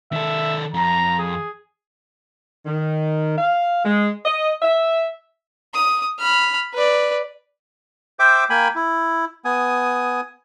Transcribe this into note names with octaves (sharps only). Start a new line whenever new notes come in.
D#3 A4 E5
F2 A#5
G#4
D#3
F5
G#3
D#5
E5
D#6
B5 F6
B4 D5
C5 E5 G5 D6
A#3 G5 G#5 B5
E4
B3 G#5 D#6